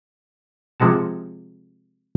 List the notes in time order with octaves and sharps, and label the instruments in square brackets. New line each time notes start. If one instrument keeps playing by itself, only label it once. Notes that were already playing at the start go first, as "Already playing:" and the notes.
[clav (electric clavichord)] C3 F3 G#3 F#4 A5